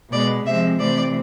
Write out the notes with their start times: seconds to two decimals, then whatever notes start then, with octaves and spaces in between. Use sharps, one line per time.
0.12 B2 G#3 B3 D5
0.46 C3 F3 G#3 C4 E5
0.80 C3 E3 A3 C4 D5